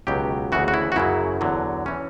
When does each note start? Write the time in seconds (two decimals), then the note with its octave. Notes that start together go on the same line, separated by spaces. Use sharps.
0.07 C#2 B2 F#3 G4
0.52 D2 C#3 E3 F#4
0.68 F#4
0.74 E4
0.92 F#4
0.96 F#2 C#3 F#3 E4
1.41 E2 D3 F#3
1.86 E3 C#4